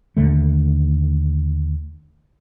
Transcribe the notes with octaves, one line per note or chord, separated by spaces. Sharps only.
D#2 D3 A3